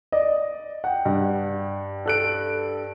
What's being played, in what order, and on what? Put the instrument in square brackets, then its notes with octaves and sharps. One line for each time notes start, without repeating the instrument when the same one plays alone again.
[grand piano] D5 D#5
F#5 G5
[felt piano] G2
[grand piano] A4 F#6 D7